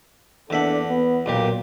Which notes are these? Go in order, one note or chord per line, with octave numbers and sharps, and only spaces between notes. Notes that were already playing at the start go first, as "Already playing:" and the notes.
E2 A#3 D4 A4 E5 F#5
B3
B1 A#2 A#3 G4